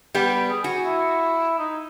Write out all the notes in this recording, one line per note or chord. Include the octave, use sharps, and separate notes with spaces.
G3 B3 G4
G#4
F#4 G#5
E4
D#4